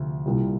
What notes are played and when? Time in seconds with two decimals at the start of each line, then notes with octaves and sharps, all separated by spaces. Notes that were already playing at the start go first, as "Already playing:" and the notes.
Already playing: D2 C3 F3
0.26 C2 A#2 G3